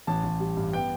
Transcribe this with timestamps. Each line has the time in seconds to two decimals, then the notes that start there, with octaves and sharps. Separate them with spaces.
0.07 A1 A5
0.24 A1
0.40 G3
0.57 G2
0.73 B3 G5